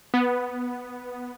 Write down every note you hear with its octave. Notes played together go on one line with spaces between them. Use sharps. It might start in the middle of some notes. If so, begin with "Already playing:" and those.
B3